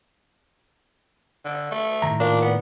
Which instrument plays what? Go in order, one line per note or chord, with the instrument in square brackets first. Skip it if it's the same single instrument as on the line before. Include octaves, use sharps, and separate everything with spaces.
[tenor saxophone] D3
A3
[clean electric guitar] A2 D#3 A#5
[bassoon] A#2 [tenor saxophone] D4
[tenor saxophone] B3